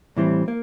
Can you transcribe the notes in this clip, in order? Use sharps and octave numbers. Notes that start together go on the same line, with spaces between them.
A2 E3 G3 C4
A#3